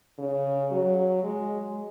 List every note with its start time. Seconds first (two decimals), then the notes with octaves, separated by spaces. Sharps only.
0.18 C#3
0.71 F#3
1.24 G#3